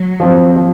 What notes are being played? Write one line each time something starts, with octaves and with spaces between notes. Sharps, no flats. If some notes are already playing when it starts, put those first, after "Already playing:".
Already playing: F#3
F3 C4
F3